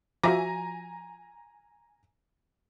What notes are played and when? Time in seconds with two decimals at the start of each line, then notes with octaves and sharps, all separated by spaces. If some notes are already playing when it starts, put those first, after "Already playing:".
0.23 F3 F#4 E5 G#5 A#5 D6 A#6